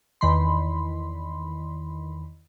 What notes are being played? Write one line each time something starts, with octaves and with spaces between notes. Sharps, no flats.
E2 D#3 B5 C6